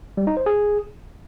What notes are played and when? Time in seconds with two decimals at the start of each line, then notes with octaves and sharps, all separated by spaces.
0.17 G3
0.27 D#4
0.37 C5
0.46 G#4